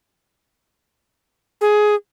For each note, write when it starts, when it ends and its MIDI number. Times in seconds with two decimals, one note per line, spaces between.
1.61 1.95 68